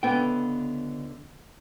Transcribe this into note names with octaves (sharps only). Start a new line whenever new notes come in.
C#2 D3 B3 G5